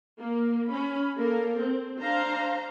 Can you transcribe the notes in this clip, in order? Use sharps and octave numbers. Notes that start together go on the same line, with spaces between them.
A#3
C#4 B5
A#3 A4 A#4
C4
D4 C5 F5 A#5